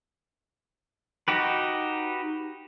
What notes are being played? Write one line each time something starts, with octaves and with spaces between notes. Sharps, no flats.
D#4 F#4 G4 B4